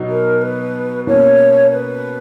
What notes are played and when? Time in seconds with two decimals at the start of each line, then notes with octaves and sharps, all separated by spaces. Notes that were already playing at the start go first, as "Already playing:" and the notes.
Already playing: B2 F#3 B3 D#4
0.09 A#4
0.42 B4
1.07 B2 A#3 C#4 C#5
1.73 B4